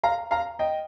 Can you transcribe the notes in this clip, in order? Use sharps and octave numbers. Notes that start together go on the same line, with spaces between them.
F5 A#5
F5 A#5
D#5 G5